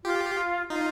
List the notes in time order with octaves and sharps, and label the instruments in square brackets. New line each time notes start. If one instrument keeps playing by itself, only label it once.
[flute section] F4 [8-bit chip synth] G4
[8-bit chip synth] D#4 [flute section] F4